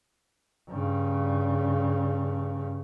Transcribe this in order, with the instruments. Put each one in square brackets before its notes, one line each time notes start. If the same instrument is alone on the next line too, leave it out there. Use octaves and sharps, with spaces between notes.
[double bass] G2 C#3